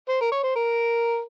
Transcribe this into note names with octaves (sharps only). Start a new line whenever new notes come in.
C5
A#4
C#5
C5
A#4